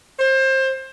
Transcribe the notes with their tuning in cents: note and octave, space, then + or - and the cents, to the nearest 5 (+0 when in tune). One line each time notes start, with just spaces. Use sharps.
C5 +25